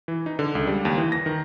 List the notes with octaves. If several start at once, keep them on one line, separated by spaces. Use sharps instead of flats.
E3
D#4
D3
C#2
G3
D#2
E3
A#6
D#3